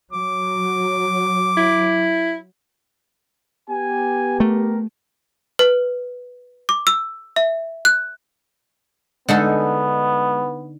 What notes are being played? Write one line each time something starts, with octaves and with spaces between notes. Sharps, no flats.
F#3 D6
E4
B3 G4 G#5
A3 A#4
B4
D6
E6
E5
F#6
D3 G#3 B3 D#4 A4 G#5